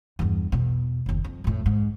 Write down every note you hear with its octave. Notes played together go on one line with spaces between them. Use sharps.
E2 G2
E2 B2
F#1 D#2
F2
F2 A2
G#2